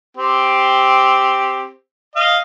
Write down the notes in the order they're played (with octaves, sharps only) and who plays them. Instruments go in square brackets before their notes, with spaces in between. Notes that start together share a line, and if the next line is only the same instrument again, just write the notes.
[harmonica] C4 G4
D#5 F5